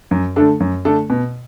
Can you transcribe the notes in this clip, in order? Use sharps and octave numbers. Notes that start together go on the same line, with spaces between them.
F#2
D3 A3 D4 A4
F#2
D3 A3 D4 A4
B2